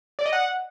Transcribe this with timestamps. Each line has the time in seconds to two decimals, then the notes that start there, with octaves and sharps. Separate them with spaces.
0.19 D5
0.26 D#5
0.33 F#5